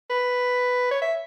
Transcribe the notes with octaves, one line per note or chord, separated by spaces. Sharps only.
B4
C#5
E5